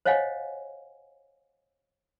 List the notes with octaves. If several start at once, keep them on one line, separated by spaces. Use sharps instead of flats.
C5 C#5 D#5 F5 F#5 G#5